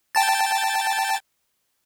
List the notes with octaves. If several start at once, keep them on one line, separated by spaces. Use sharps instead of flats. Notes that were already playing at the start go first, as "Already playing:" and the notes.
G5 A5 A6